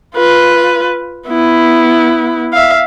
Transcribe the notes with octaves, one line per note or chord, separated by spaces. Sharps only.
F4 B4
B3 E4
E5 F5